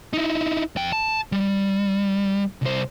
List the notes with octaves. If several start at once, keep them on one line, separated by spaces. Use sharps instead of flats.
D#4 E4
F2 G5
A5
G3
C2 C5